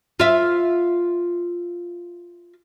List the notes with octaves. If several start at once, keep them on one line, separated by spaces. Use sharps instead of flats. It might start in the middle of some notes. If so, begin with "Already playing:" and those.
F4 E5